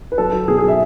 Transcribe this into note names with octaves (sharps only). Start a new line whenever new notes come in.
B4
F#3 A4
F#3
B2 G#4
G#4
F#3
E5